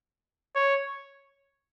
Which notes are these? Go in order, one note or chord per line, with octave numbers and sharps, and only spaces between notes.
C#5